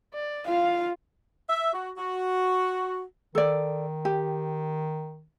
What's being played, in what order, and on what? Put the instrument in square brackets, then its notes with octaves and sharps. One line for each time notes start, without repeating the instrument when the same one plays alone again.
[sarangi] D5
[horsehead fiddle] F4 [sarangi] F5
[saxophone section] E5
F#4
F#4
[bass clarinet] D#3 [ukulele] A4 D5
[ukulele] G4